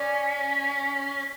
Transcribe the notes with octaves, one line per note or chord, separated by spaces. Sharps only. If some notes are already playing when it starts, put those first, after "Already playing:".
Already playing: C#4 D5